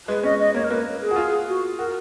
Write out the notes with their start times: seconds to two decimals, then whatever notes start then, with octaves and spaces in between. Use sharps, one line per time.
0.08 G#3 B4
0.23 C#4 D#5
0.39 D#5
0.54 A#3 C#5
0.64 A#4
0.70 A#3 B4
1.01 G#4
1.11 F#4
1.16 F4
1.48 F#4
1.78 F#4 A#4